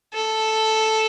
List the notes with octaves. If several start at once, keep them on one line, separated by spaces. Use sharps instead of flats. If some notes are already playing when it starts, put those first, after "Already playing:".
A4